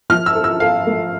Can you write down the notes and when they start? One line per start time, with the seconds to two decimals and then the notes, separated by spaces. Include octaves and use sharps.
0.10 F3 F6
0.26 E6
0.36 A4
0.44 E6
0.60 A4 F5
0.86 A3